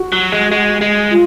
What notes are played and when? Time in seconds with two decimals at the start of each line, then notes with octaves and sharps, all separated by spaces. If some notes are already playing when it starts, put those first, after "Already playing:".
Already playing: F#4
0.12 F#3
0.32 G#3
0.51 G#3
0.81 G#3
1.11 F4